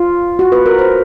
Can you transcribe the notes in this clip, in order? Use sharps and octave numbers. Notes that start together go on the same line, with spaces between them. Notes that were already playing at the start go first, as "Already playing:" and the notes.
Already playing: F4
F#4
B4
A#4
C5